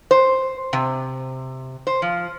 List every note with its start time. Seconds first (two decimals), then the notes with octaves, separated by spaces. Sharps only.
0.11 C5
0.73 C3
1.87 C5
2.02 F3